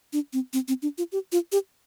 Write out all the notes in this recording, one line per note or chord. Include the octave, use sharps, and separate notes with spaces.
D4
C4
C4
C4
D4
F4
G4
F4
G4